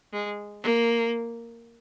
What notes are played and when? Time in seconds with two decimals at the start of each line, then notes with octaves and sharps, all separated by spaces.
0.13 G#3
0.63 A#3